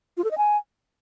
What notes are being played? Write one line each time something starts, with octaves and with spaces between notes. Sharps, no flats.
F4
A4
D#5
G#5